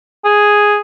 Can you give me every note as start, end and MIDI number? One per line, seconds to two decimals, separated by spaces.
0.25 0.79 68